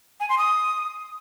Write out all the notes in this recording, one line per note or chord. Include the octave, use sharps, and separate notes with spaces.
G#5
C6
D#6